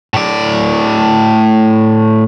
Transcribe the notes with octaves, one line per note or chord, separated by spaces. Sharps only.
A2 D5